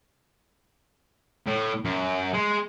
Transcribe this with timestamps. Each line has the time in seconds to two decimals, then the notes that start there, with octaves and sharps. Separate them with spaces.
1.46 A2
1.85 F#2
2.34 G#3